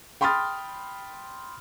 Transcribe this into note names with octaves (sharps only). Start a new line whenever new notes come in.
G5 B5 C6 D#6 F6 A6